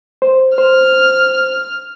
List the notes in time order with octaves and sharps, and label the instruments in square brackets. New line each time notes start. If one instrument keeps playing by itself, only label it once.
[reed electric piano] C5
[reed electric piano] C5 [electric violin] F6